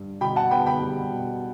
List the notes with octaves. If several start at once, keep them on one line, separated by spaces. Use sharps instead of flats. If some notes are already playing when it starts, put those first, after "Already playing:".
Already playing: G2
B2 G5 B5
F#5 A5
B3 G5 B5
G5 B5
G3
B2